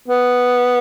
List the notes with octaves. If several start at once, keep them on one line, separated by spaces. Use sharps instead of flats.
B3